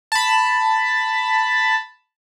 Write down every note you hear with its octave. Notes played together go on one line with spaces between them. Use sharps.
A5 B5